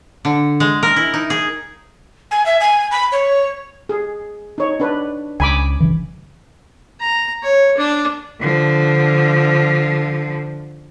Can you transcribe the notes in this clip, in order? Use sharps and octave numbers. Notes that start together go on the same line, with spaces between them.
D3
G#3
A#4
E4
D#4
G#4
G#5
E5
G#5
B5
C#5
G#4
D#4 C#5
D4 B4
C#2 G#5 B5 D6
G1 C#3 E3
A#5
C#5
D4
D3 F3